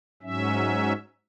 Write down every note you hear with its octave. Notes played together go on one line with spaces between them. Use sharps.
G#2 F#3 C#4 E5